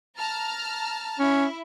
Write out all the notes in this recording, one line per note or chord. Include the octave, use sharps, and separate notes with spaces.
A5 A#5 F6
C#4 E4